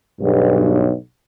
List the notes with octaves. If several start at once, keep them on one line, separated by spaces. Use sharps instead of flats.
B1 G2